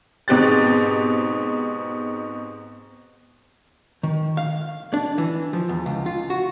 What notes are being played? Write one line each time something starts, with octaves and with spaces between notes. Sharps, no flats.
G#2 B2 C4 G4 F#6 A6
D#3
F5
D4
E3
F3
E2
C#2
F4
F#4